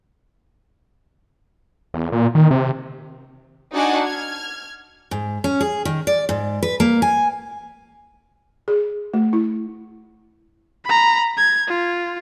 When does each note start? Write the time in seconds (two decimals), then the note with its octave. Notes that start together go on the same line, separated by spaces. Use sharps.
1.94 E2
2.12 A#2
2.35 D#3
2.51 C3
3.73 D4 D#4 F#4 F#5 G#5
4.03 F6 G#6
5.11 G#2
5.44 C#4
5.61 G#4
5.85 D#3
6.07 D5
6.29 G#2
6.63 B4
6.80 A#3
7.02 G#5
8.68 G#4
9.14 A3
9.33 E4
10.85 A#5 B5
11.37 G#6
11.68 F4